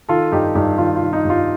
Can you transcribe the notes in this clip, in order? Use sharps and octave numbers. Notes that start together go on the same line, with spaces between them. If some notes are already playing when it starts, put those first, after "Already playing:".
D#3 F4 A4
G2 D#4 G4
G2 D#4 G4
D#3 F4
F4
D#3
D#4
G2
F4